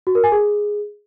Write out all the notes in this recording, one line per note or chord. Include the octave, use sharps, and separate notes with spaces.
F#4
A#4
G#5
G#4